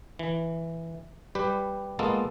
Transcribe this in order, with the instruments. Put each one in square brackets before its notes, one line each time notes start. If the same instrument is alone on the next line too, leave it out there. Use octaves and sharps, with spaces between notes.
[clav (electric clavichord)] E3
G3 G4 B4
G#3 A#3 B3 F4 A4